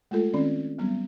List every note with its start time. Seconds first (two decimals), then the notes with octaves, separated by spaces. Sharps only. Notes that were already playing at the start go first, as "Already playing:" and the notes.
0.11 G#3 A3 F4 A4
0.34 D#3 C4 C#4 D5
0.78 F#3 G3 B3